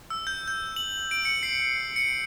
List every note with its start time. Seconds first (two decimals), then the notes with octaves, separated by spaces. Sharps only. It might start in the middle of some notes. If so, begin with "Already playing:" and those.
0.10 E6
0.27 G6
0.48 G6
0.76 F#7
1.11 D7
1.25 C#7
1.43 C7
1.96 C#7